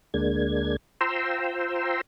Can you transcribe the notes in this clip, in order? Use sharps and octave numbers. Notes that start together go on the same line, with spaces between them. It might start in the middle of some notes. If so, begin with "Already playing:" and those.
D2 G#3 A#3 D4 G#6
F4 C5 G5 A#5 C6 E6